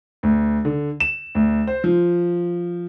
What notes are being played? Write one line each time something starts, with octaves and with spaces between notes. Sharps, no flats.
D2
D3
E7
D2
C5
F3